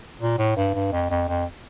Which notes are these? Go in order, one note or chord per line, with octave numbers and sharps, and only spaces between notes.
A#2
A2
G2
G2
F2
F2
F2